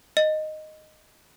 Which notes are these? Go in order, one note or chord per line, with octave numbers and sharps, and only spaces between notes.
D#5